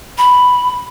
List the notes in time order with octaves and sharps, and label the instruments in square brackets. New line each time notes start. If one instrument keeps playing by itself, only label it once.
[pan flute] B5